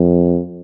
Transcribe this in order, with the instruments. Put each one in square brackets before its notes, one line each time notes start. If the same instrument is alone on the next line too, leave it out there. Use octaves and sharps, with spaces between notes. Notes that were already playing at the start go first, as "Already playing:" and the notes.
Already playing: [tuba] F2